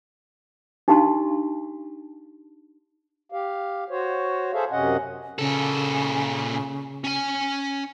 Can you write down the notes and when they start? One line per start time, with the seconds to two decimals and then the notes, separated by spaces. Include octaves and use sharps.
0.88 D4 D#4 G4 F5 A5 C6
3.32 G4 F5
3.90 F#4 C5 C#5
4.53 G#4 A4 C5 E5 F5
4.71 F#2 C3 C#4 D#5 F#5
5.38 A#2 C#3 A4
7.05 C#4 G#5